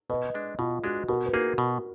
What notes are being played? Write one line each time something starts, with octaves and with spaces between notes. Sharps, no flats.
B2 B4 D#5
G#3 D4
B2 F4
G#3 D4 F#4
B2 F#4 A#4
B4
A#3 D#4 F#4 G#4 A#4
B2